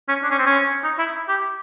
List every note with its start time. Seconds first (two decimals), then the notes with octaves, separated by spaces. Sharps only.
0.09 C#4
0.23 D4
0.31 C#4
0.38 C4
0.47 C#4
0.84 D#4
0.99 E4
1.29 G4